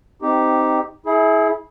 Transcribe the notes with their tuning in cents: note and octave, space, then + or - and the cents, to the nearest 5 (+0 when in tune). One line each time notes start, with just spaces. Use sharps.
C4 -15 D#4 +0 G4 +0
E4 -20 G#4 +25